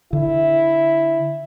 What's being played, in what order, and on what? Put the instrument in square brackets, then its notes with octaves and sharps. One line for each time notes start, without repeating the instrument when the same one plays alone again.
[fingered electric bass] D3 [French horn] E4